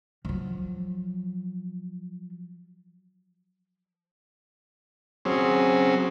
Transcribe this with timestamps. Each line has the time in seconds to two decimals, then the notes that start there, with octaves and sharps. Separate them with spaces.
0.25 F3 F#3
5.25 F#3 C4 C#4 G#4